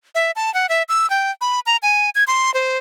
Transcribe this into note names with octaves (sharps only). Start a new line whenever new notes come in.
E5
A5
F#5
E5
E6
G5
B5
A#5
G#5
G#6
C6
C5